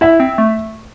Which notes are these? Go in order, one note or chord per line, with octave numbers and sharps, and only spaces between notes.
E4 E5
C4
A3